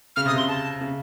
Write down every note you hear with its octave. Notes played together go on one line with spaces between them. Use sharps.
C#3 F6
C3 D#6
C#3 C6
A5
C#3